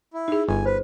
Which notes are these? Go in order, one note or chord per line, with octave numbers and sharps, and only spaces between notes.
E4
D#4 G#4
G1 G#5
B4 C5